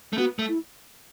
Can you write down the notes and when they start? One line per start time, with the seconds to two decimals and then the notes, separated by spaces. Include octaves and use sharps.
0.13 A3
0.18 B3 F#4
0.39 A3
0.48 E4